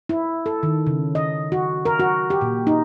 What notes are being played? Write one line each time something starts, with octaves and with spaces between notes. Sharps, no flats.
E4
A4
D#3
C#3
D#5
F#4
A#4
F#4
G4
A#2
D#4